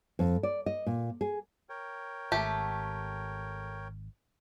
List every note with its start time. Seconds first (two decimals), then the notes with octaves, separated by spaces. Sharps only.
0.19 F2
0.43 D5
0.66 D#5
0.87 A#2
1.21 G#4
1.69 A#4 C#5 G5
2.32 G#1 A3 G4 A5